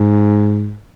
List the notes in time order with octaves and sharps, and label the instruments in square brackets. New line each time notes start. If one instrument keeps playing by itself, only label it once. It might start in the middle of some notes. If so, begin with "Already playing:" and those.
Already playing: [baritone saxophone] G#2